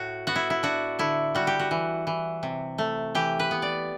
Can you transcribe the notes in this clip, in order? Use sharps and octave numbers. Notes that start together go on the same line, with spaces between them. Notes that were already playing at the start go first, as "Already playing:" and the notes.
Already playing: A2 F#4
B3 F#4
E4
E4
D4 F#4
D3 E4
G3 F#4
G4
F#4
E3
E3
C3
A3
E3 G4
B4
B3
D5